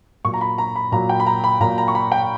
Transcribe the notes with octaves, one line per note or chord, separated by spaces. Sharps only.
A#2 F#3 A#3 C#6
A#5
B5
A#5
B5
A#2 F#3 A#3 A#5
G5
B5
A#5
B5
A#2 F#3 A#3 A#5
A#5
C#6
B5
G5